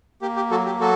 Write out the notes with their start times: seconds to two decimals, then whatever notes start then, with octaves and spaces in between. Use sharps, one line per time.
0.22 A#3 G4
0.36 G4
0.51 F#3 F#4 A4
0.66 G4
0.81 F#3 F#4 A4